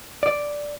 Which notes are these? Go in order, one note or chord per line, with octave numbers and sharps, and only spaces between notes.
D5